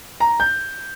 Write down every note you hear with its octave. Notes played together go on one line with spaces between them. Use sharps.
A#5
G6